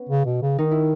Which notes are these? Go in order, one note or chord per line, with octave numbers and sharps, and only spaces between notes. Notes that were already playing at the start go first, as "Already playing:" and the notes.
Already playing: B3 C#4
C#3
B2
C#3
D#3 D#4
E4